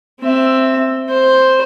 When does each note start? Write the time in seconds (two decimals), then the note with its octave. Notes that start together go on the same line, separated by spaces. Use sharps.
0.21 C4 E5
1.09 C5